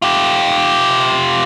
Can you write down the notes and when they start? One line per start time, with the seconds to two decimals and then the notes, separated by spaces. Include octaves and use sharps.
0.02 F4 G4